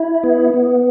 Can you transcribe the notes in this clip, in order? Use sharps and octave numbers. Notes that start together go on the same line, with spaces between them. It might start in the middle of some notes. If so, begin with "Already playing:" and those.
Already playing: E4
B3
B3